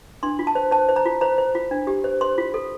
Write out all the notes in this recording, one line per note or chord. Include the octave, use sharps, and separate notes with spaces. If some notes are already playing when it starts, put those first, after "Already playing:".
D4 C6
F4
A5
C5
C5 A5
C5
A#5
F4
C5 A#5
C5
F4
D4
G4
C5
C5 C6
F4
A4